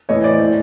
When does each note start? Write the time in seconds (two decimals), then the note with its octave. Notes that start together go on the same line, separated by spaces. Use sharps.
0.09 A2 E3 C#5 D#5
0.24 C5 D5
0.40 A2 E3